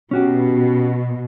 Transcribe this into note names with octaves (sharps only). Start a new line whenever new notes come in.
B2 C#4 F#4 G4